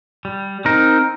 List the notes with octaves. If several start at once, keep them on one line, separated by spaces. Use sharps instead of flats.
G3
C4 D#4 A#4